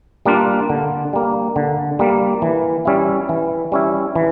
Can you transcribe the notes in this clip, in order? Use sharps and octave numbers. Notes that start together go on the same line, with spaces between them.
G3 A#3 D4 F4
D3
G3 A#3
D3
G3 A#3
E3
G3 C#4 E4
E3
G3 C#4 E4
E3